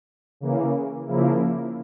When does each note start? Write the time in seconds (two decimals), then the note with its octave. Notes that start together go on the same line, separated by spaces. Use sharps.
0.41 C#3 E3 A#3
1.06 C#3 F3 A#3 E4